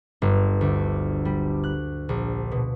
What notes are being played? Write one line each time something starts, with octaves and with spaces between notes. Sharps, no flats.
G1
D2
G3
F#6
A#1
B2